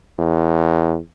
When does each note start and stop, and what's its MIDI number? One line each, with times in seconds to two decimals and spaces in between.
0.19 0.98 40